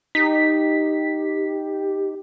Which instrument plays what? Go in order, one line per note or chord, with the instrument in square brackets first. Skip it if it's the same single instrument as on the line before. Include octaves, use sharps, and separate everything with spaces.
[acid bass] D#4 [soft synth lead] G4 [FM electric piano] B6